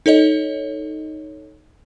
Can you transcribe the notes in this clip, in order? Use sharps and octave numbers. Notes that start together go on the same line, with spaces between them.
D#4 A4 C#5 D#5